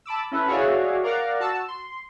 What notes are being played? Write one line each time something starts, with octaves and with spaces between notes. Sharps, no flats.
A5 B5 D6 E6
C#4 E4 A4 B4
F#4 G#4 C#5 D5 E5 F5
A#4 D5 F5 F#5 A#5
F#4 A5 E6
C6